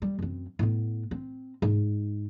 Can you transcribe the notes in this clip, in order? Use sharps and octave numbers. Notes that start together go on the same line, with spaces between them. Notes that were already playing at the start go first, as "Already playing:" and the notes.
G3
F#2 C4
A2 B3
C4
G#2